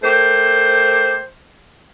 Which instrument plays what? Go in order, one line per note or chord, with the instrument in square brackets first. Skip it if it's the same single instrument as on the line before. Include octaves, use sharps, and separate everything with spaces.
[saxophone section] A3 G4 A#4 C5